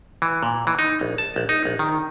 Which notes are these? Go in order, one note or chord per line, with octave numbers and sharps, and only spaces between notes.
E3
A#2
E3
D#4
A#1
A5
A#1
D#4
A#1
D#3